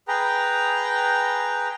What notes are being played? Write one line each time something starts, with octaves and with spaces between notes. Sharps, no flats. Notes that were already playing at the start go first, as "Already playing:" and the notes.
G#4 B4 G5 A#5